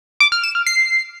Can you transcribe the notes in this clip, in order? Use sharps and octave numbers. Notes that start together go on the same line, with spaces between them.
D6
F6
E7
F6
C7